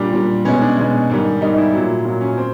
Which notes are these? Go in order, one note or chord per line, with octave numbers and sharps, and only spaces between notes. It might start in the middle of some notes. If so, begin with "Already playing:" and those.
Already playing: A#2 G3 D4
A#2 G3
B2 G#3 C#4
D4
B2 G#3
G#2 D#3 G3
G#2 D#3 G3 D#4
E4
A#2 F#3
A#2 F#3
C#4
C4